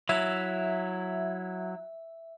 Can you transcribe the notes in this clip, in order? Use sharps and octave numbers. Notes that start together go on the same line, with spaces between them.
F#3 E4 E5